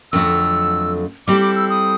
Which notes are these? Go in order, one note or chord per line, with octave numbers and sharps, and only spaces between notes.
F2 D3 F#3 A3 E6
G3 C4 E4 A4 D6
D6
E6
D#6